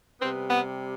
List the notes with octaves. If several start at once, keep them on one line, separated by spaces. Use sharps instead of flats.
C3 G3 B3 C4
B3